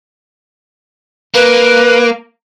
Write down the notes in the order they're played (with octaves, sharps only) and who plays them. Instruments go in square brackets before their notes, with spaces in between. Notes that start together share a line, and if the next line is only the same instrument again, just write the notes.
[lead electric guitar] A#3 [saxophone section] B4